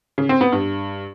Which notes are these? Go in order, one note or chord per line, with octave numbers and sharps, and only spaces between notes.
C#3
C4
B3
G2